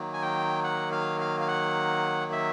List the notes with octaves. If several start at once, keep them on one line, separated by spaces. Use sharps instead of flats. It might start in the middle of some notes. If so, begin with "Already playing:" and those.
Already playing: D#3 F#3 A#3
G#5
G5
F#5
F5
F5
F5
F#5
E5